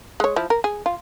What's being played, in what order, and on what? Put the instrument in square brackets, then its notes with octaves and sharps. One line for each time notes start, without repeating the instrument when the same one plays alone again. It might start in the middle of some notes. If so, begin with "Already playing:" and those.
[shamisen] G#3 C#5
F3 E4
A#4
G#4
F4